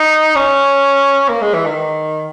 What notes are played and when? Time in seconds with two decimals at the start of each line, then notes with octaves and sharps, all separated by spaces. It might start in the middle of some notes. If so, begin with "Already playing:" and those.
Already playing: D#4
0.35 C#4
1.29 A#3
1.41 G#3
1.54 E3
1.65 D#3